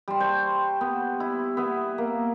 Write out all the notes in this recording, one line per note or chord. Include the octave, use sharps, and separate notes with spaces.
G3 C6
C5 A5 C#6
B3
E4
B3 E5
A#3